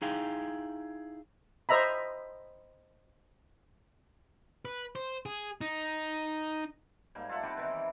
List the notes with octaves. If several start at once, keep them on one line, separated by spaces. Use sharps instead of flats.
D#4 E4 G#4 F5 G5
C5 D#5 E5 A#5 B5
B4
C5
G#4
D#4
G#2 G3 A#3
F4 A4 E5 F#5
G3 C4 E4 D5
C3 D#3 B4
E3